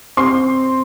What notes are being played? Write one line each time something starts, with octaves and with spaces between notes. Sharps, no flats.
C4 C6